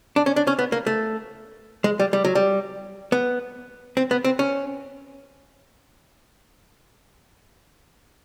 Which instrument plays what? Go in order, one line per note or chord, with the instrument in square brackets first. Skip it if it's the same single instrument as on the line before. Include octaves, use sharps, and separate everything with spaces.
[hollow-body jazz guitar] D4
C#4
D4
C#4
B3
A#3
A3
G#3
G3
G3
F#3
G3
B3
C4
B3
C4
C#4